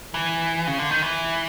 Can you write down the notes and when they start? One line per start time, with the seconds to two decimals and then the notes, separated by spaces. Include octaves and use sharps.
0.14 E3
0.67 C#3
0.79 D3
0.90 D#3
1.02 E3